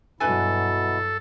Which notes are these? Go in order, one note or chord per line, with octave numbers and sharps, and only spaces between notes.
G2 B2 F#3 D4 E4 A4 B4 G#5